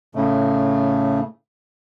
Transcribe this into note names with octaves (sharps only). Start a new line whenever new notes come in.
A2 C#3 A3